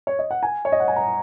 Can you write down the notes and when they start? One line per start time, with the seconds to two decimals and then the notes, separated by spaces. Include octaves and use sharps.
0.07 C#5
0.19 D#5
0.31 F#5
0.43 G#5
0.65 C#5
0.72 D#5
0.80 F#5
0.88 G#5
0.96 A#5